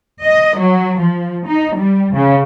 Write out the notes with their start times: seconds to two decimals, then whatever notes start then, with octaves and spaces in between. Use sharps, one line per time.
0.25 D#5
0.59 F#3
1.00 F3
1.48 D#4
1.77 G3
2.15 C#3